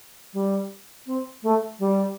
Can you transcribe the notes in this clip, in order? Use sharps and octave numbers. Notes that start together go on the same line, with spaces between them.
G3
C4
A3
G3